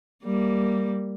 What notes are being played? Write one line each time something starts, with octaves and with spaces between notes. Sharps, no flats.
G3 A#3